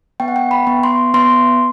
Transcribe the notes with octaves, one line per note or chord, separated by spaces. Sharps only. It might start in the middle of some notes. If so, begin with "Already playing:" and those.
B3 G5
F#5
G5
B5
B3
C6
B3 C6